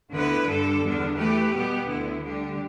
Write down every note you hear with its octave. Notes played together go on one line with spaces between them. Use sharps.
D2 D3 B3 E4 B4
G2 D3 G3 D4 A4
E2 D3 B3 D4
E3 A3 G4 B4
B2 G3 B3 G4
D2 D3 B3 E4
D3 G3 D4 G4